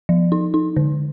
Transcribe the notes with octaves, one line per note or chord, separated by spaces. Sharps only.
F3
D#4
D#4
D3